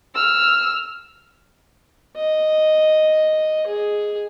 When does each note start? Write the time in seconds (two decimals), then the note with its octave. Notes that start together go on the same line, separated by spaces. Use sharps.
0.15 E6 F6
2.16 D#5
3.67 G#4